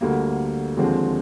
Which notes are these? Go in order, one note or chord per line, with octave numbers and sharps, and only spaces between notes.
D2 D3 G3 A#3
D#2 D3 F3 G#3 C4